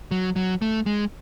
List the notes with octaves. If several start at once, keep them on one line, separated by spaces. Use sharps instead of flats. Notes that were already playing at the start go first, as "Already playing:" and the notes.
F#3
F#3
A3
G#3